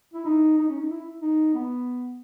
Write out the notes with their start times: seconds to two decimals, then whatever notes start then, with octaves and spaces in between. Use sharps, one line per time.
0.14 E4
0.26 D#4
0.58 D#4
0.69 C#4
0.79 D#4
0.90 E4
1.22 D#4
1.54 B3